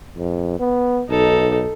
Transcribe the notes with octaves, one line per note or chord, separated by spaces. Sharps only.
F2
B3
B1 D#4 A4